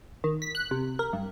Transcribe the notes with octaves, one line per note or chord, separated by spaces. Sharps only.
D#3
B6
F#6
C3
A#4
G2